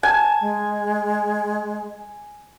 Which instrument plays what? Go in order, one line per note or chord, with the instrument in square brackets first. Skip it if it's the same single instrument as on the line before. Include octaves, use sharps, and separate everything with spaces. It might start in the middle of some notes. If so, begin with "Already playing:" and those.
[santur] G#5 [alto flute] A5
[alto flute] G#3